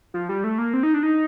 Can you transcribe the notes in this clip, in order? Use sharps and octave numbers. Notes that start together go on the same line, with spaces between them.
F3
G3
A3
A#3
C4
D#4
D4
D#4